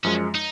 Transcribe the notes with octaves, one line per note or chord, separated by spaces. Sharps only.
F#2 F3 G#3 C#4
D#4